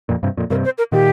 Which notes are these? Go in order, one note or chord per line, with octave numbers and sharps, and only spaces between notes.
F2 A#2
G2 C3
F2 A#2
G2 C3 A#4
C5
A#4
A#2 D#3 G4